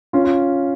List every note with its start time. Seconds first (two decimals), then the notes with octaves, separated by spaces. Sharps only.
0.13 C#4 F4
0.24 F4